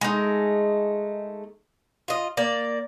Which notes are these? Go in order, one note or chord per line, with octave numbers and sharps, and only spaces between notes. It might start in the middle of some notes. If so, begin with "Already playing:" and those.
G#3 A3 D#4
F4 D#5
A#3 D5